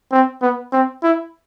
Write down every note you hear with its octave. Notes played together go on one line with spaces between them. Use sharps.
C4
B3
C4
E4